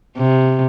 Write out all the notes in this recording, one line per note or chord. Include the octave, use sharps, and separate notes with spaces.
C3